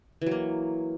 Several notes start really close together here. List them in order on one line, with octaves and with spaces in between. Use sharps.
E3 F#3 A#3